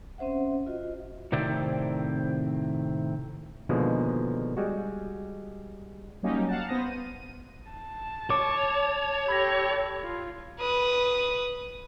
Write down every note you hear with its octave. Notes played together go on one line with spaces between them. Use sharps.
C4 C#4 C5 E5 F#5
F4 F#4 D#5
A2 C3 D#3 C4 E4 D5
B2 D3 D#3 F3 G#3 A#3
G3 G#3 F#4
F#3 G3 A#3 C#4 D#4 G4
F5 F#5 A5
B3 C5 D#6 A#6
D#7
A5
C#5 D6
G4 A4 B5 G#6 A#6
F4
B4 D#6